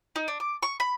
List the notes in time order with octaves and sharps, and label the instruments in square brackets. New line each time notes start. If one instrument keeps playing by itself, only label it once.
[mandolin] D#4
D4
D6
C#6
B5